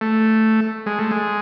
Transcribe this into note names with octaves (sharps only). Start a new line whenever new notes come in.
A3
G#3
A3
G#3